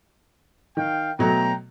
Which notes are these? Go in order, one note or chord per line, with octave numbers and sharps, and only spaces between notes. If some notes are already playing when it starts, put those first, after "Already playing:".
D#3 F5 G5
B2 F#3 A3 G5 A#5